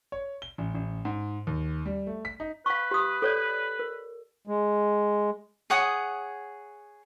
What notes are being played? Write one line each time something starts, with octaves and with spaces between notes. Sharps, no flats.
C#5
G7
A1
A1
G#2
D#2
G3
A3
B6
D#4
B4 F5 C#6
G4 D#6
A4 C#5 D5
A#4
G#3
G#4 C#5 F#5 D#6